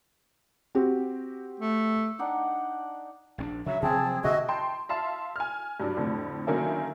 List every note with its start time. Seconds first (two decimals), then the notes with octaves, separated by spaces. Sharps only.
0.75 C4 F#4 G4
1.60 A3
2.19 D4 D#4 F#5 G5
3.38 A#1 C4 D4
3.66 C#3 F#3 E5
3.82 C3 F3 F#3 C4 G#4 A5
4.24 B2 D3 A#3 F#4 D#5 E5
4.48 G5 A5 C6
4.89 E5 F5 A5 C6
5.36 G#5 F6
5.80 G2 F#3 D4
5.97 F2 A2 D3
6.47 D3 D#3 F#3 A#3 C#4 E4